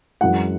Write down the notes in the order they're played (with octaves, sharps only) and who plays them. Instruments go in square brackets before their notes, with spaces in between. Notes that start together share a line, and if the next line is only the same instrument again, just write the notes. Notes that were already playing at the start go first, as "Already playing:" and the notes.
[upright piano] F#2 E3 G#3 F#5